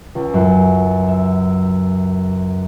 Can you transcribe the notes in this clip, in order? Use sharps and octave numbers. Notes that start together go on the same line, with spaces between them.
C#2
F#2
E5